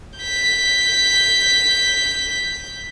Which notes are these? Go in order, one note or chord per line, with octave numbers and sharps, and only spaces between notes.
G6 B6